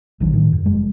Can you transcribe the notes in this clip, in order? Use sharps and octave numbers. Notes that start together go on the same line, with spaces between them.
A#1 D#3 F#3 D4
A2 D#3
F#2
F1 G3 G#3